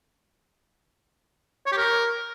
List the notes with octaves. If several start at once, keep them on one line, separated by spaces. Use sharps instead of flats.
C#5
G4
A#4